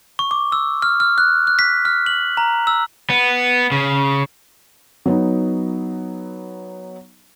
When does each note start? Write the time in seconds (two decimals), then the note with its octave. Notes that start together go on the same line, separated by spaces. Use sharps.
0.19 C#6
0.31 D6
0.52 E6
0.82 F6
1.00 F6
1.18 F#6
1.47 F#6
1.59 B6
1.85 F6
2.06 F#7
2.37 A#5
2.67 E6
3.10 B3
3.72 C#3
5.06 F#3 B3 D#4